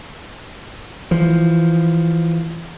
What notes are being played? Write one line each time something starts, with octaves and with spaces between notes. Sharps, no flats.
E3 F3